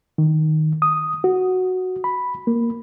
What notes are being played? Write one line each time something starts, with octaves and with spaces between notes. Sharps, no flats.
D#3
D#6
F#4
B5
A#3